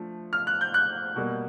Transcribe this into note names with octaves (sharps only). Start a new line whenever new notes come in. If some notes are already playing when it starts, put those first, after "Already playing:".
Already playing: F3 A3 D4
F6
F#6
G6
F#6
B2 G3 A#3